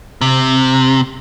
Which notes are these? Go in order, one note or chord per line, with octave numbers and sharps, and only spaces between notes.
C3